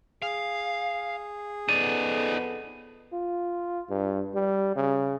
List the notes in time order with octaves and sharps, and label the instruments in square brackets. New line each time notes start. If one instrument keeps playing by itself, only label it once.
[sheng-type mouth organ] G#4 [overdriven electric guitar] F5
[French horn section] F2 B3 A4 [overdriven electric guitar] D#4 D5 [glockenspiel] D#7
[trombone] F4
G2
G3
C#3